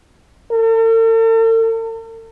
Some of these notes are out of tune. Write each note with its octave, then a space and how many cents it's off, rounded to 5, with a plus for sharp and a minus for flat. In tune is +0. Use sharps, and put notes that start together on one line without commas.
A4 +45